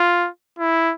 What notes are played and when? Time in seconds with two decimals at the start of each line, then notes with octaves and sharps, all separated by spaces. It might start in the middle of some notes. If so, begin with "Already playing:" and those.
Already playing: F4
0.59 E4